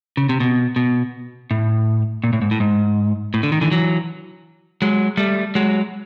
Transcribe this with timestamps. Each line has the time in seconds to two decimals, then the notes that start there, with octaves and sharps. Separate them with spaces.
0.17 C#3
0.29 C3
0.40 B2
0.76 B2
1.51 A2
2.24 A#2
2.33 A2
2.42 G#2
2.51 A2
2.60 G#2
3.34 A2
3.43 D3
3.52 D#3
3.61 D3 E3
3.71 E3 F#3
4.82 F#3 G#3
5.17 G3 A3
5.55 F#3 G#3